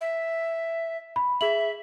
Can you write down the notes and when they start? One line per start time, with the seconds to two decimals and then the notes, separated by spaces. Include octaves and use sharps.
0.01 E5
1.16 B5
1.41 G#4 E5 F#7